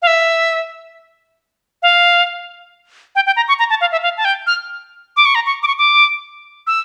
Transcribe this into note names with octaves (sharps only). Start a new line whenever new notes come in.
F5
E5
F5
G5
G5
A#5
C#6
A#5
A5
F5
E5
F5
A5
G5
F6
D6
C#6
A#5
C#6
D6
C#6
D6
E6